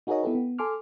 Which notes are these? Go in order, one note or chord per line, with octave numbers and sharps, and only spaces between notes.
D#4 F#4 G#4 A#4 C#5 D#5
B3 E4 G4 A4 B4
B3
A4 G#5 C6 D6 F6